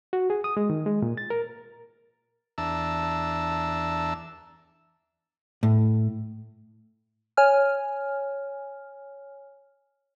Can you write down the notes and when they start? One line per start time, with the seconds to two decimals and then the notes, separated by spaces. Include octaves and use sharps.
0.13 F#4
0.30 G#4
0.44 D#6
0.57 G#3
0.70 D#3
0.86 G#3
1.02 A#2
1.17 A6
1.30 A#4
2.58 E2 D4 E5 A5 A#5 E6
5.63 A2
7.37 C#5 G#5 F6